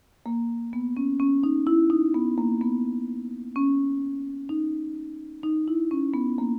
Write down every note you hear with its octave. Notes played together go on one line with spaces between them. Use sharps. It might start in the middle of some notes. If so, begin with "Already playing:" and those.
A#3
B3
C#4
C#4
D#4
E4
D#4
B3
A#3
B3
C#4
D#4
D#4
E4
C#4
B3
A#3